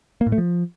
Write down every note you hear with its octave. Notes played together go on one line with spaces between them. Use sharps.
A#3
A2
A3
F3